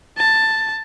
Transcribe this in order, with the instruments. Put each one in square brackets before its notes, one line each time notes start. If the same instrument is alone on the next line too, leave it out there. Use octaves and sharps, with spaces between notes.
[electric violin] A5